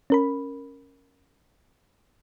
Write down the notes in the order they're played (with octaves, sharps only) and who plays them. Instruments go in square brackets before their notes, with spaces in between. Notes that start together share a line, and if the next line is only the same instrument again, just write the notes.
[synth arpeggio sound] C#4 A#4 B5